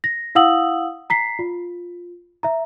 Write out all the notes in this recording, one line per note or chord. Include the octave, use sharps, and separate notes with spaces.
A#6
E4 F5 F#5 D#6 E6 F#7
A#5 B6 C7
F4
E5 A#5